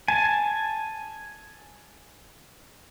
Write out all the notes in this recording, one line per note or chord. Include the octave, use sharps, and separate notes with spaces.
G#5 A5